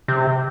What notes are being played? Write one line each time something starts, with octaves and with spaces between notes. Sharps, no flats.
C3